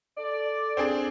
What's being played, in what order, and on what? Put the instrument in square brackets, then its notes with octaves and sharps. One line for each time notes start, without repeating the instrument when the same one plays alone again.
[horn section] A4 D5
[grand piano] C4 D4 G#4